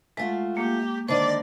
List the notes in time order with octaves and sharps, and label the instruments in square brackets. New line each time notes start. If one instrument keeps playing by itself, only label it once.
[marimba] G#3 [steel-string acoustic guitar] A3 F4 F#4
[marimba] A#3 [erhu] G4
[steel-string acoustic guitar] D3 D#3 D#4 [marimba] C5 [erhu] D5